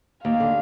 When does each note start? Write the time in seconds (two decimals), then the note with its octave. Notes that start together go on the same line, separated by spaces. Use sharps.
0.24 D#2 F5
0.40 D3